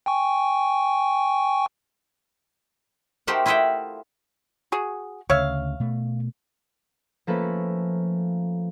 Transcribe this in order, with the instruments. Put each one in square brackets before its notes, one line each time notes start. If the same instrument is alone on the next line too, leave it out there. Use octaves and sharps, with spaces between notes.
[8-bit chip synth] G5 G#5 C#6
[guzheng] A3 D#4 G4 A#4 C5 F#5
E4 F4 D#5 E5 F#5 G5
[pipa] F#4 G#4
[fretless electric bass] D2 C#3 [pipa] C#5 E5 F5
[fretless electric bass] B2 A3
[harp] F3 A3 A#3 C#4 A4 B4